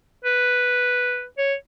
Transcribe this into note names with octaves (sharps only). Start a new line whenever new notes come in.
B4
C#5